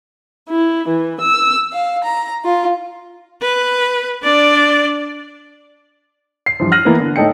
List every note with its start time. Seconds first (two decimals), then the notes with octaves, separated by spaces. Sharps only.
0.49 E4
0.88 E3
1.20 E6
1.73 F5
2.03 A#5
2.44 F4
3.42 B4
4.23 D4 D5
6.46 C7
6.60 G2 E3 F3
6.72 F6 F#6 A#6 D#7 F#7
6.85 E3 A#3 B3 A#4
7.00 D3
7.16 A2 D#4 A4 G5 C#7